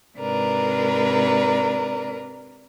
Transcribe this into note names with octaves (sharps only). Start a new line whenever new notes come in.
G#2 C3 D4 A#4 B4 A#5